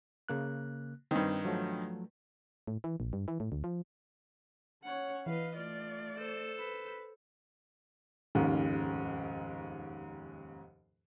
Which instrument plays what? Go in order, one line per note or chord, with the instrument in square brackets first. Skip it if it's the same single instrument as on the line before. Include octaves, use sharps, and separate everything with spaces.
[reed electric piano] C#3 A#3 F#6
[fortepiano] G2 D#3 [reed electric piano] C4
[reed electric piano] F3 F#3 A3
[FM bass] A2
E3
A#1
G2
E3
A2
D2
F3
[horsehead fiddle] C#4 C#5 [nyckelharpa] F#5
[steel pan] E3 [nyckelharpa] B4 D#5 [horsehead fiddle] F5
[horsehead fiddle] A3 D5 [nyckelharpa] F4
[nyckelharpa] A4 C5
[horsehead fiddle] B4
[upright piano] F1 D#2 G#2 C#3